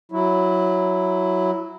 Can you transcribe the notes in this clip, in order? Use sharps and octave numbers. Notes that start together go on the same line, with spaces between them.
F#3 E4